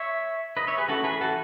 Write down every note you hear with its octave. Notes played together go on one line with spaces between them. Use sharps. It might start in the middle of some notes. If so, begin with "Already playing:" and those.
Already playing: C#5 E5
B4 D#5
C#5 E5
G#4 B4
E3 A3 C#4 F#4 A4
G#4 B4
F#4 A4